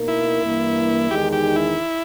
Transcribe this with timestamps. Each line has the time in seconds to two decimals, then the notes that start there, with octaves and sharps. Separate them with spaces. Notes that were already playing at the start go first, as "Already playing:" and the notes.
Already playing: B2 A#3 D#4 A#4
0.08 E4
0.43 G2 E3 A#3
1.10 E2 D#3 G#3 D#4 G4 G#4
1.33 G4
1.56 E4